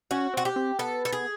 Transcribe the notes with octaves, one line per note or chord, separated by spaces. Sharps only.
C#4 F#4
C4 F#4
G4
C4
B3 A4
A4
G#4